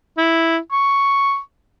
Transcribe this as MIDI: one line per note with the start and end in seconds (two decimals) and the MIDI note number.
0.18 0.58 64
0.72 1.39 85